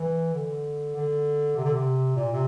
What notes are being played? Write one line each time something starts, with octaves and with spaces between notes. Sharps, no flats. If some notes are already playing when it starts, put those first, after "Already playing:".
Already playing: E3
D3
D3
C3
D3
C3
A#2
C3